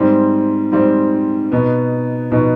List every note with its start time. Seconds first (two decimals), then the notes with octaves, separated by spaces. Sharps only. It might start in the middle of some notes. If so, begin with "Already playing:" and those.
Already playing: G#2 G3 C4
0.72 G#2 G3 C4
1.51 B2 B3 D#4
2.31 B2 B3 D#4